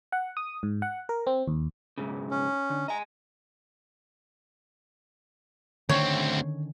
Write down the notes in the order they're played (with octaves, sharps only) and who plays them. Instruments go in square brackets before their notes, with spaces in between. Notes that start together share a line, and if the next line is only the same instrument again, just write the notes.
[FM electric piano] F#5
D#6
G#2
F#5
A#4
C4
D#2
[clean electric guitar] B1 G#2 C#3
[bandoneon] C#4
[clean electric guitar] D3
[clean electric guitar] D#5 G#5 [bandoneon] A#5
[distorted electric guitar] D2 C4 [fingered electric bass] D3 D#3 C#4 [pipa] C#5